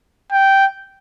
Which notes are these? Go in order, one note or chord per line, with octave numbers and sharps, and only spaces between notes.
G5